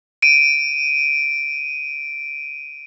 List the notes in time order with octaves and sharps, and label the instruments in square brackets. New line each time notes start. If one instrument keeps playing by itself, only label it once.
[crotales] D7 D#7